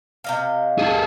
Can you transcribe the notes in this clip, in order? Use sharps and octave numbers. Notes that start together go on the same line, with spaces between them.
C3 D#5 F5
G#4 A4